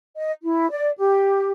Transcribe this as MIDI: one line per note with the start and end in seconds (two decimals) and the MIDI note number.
0.15 0.31 75
0.42 0.69 64
0.70 0.90 74
0.97 1.52 67